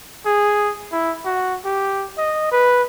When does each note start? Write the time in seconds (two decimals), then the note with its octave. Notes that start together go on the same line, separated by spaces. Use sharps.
0.26 G#4
0.92 E4
1.26 F#4
1.65 G4
2.18 D#5
2.52 B4